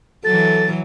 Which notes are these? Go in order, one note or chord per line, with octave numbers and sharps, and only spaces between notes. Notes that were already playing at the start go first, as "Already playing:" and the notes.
E3 F#3 A4 A6